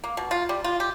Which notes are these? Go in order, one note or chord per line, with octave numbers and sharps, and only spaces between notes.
A#3
B2
F4
G3
F4
G4